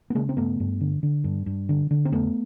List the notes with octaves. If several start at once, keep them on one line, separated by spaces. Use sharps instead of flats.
B3
C#3 G#3 A#3
C4
G2 A3 B3
G2
D3
D3
G2
G2
D3
D3
C4
F2 A3 B3